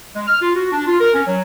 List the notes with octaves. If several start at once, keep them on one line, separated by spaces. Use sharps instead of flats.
G#3
F6
F4
F#4
D4
F4
A#4
C#4
F#3